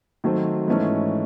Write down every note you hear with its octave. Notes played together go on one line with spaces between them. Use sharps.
D#3 F#3 A3 C4
G#2 E3 A3 C#4